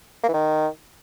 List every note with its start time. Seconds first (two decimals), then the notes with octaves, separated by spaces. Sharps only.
0.23 A#3
0.29 E3
0.34 D#3